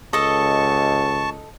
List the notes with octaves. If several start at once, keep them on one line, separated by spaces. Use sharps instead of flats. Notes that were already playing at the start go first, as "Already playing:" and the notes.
C#2 A4 D#5 A5 C#6